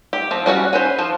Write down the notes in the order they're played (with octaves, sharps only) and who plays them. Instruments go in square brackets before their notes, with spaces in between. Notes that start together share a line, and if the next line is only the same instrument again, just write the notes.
[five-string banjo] G4
F3 C4
G3 C#4 F#4 F#5
C#4 B4 C5
F3 C5